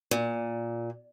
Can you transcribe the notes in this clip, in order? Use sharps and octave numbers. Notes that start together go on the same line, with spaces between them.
A#2